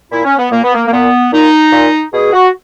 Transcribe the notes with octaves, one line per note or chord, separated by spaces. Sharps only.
A#2 E4
C#4
B3
A#2 A#3
B3
A#3
A#3
A#2 B3
A#2 D#4
A#2
B2 G#4
F#4